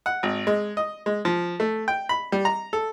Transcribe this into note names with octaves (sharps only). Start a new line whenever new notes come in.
F#5
G#1
G#3
D#5
G#3
F3
A3
G5
B5
G3
A#5
A4